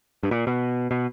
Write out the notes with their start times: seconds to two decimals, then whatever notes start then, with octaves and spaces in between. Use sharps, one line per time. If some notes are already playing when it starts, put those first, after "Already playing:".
0.23 G2
0.31 A#2
0.47 B2
0.91 B2